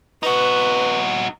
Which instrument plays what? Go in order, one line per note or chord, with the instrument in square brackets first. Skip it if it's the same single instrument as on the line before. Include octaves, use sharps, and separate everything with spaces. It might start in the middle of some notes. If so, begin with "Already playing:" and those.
[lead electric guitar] D#4 F#4 [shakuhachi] B4